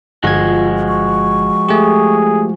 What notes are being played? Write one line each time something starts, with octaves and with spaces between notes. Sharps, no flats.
G1 F3 G#3 F4 F#4 G#6
C#6
A3 G4 G#4